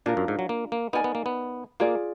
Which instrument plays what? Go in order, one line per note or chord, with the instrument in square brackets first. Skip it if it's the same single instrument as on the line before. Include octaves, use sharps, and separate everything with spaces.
[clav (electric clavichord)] A#2 [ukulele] D4 F4 A#4
[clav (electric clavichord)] F#2
G#2
F#3
A#3
A#3
[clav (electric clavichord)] B3 [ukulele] D#4 A#4 D5 G#5
[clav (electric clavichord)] B3
A#3
B3
[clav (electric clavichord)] A#3 [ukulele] F4 G#4 D5